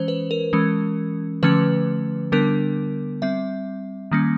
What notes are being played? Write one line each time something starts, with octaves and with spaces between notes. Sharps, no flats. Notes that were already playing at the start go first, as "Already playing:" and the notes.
Already playing: E3 G#3 C#4 C5
B4
A#4
E3 G#3 C#4
D3 F3 A3 C#4 B4
D3 G3 B3 D4 A#4
G3 C4 E5
D#3 G3 A#3 C#4